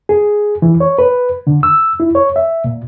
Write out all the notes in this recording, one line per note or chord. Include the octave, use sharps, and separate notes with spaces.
G#4
E3
C#5
B4
D3
E6
E4
C#5
E5
A#2